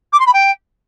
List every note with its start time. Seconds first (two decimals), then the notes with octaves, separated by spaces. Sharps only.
0.13 D6
0.20 C6
0.27 B5
0.34 G5